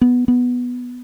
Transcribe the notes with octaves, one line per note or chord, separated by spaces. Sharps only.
B3
B3